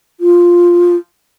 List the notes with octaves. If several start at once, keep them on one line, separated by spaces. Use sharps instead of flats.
F4